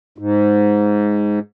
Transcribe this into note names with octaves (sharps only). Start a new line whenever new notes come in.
G#2